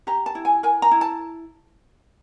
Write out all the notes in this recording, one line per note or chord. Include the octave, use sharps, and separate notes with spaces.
G4 A#5
A5
E4
G#5
A#4 G#5
A#5
E4
A5